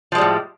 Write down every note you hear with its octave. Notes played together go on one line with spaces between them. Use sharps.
A2 F3 G3 G#3